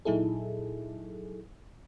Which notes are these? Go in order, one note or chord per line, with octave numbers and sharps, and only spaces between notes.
A#2 F#3 D#4 E4 G#4 A4